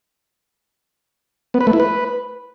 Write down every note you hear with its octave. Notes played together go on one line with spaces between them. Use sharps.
B3
B4
A3
E4
B4